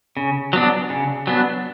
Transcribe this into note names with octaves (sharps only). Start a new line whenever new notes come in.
C#3
F#3 B3 D4
C#3
F#3 B3 D4